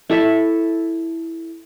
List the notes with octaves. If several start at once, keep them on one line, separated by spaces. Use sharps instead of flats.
E4 A4 E5